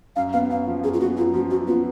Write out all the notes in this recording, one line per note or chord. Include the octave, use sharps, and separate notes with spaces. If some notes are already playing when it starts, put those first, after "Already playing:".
F#2 F5
B3 F5
F#2 F5
F3
F#2 G#4
F4
B3 F#4
F#2 F4
F3 F#4
F#2 F#4
B3 F4